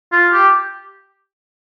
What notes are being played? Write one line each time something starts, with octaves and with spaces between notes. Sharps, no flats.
F4
G4